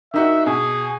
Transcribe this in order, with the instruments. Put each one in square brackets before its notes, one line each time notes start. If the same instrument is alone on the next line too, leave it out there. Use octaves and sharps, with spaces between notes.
[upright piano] D#3 D#4 F#4 [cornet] E5
[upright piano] B2 [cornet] G#4